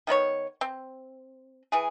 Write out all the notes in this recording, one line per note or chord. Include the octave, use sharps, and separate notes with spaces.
D#3 B3 E4 C#5
C4
E3 G#4